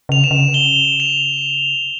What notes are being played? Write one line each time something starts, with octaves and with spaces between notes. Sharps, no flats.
C#3 F7
E7
C#3
G7
F7